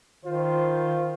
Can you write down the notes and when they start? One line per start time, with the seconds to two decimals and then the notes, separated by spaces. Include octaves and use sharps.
0.25 D#3 F4 C5